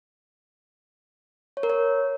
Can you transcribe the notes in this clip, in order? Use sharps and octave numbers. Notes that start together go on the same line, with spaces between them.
C#5
A#4
C#5